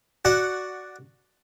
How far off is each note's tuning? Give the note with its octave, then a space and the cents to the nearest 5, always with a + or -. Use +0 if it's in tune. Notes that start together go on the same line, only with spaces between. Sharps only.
F#4 +5 D5 +0 F#5 -5